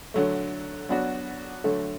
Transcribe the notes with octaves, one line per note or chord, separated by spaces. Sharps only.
D3 F#3 A3
F#3 B3 D4 F#4
D3 F#3 A3